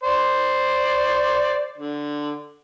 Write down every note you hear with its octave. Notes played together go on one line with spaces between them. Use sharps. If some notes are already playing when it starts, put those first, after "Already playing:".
C5 D5
D3